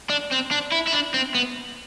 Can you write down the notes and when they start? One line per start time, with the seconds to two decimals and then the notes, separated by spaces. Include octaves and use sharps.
0.10 D4
0.31 C4
0.51 D4
0.72 E4
0.88 E4
0.93 D4
1.14 C4
1.35 B3